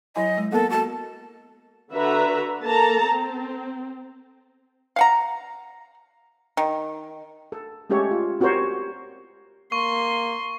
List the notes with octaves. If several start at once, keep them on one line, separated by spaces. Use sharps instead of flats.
F#3 E4 D#5 G#5
G#3
A#3 B3 A4 A#4
F#4 A4 A5
D3 F#4 B4 E5 A#5
A#3 A4 A5 A#5
C4
F5 F#5 A#5
D#3
A4
G#3 A3 C#4 G4 A4 C#5
F4
C4 F#4 G4 A#4 C5 C#5
A#3 C6 C#6